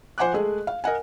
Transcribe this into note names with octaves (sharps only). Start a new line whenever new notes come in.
F3 C5 F#5 G#5 D6 F#6
G#3 A3 G#4
F5
A#4 D#5 F#5 G#5